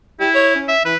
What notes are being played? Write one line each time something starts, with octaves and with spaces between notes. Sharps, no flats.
E4 G4
C#5
C#4
E5
E3 B4